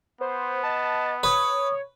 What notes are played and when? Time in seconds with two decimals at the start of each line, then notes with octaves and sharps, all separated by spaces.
0.21 B3 C5
0.63 D#5 A5
1.23 B4 C#5 D#6